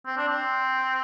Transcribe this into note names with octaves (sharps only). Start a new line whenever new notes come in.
C4
D4
C4